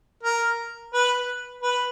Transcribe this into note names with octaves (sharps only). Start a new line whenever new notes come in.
A#4
B4
B4